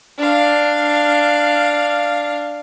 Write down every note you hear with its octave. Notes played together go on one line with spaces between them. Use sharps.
D4 F5